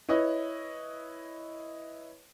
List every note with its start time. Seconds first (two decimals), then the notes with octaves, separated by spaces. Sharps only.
0.09 E4 B4 C#5 D#5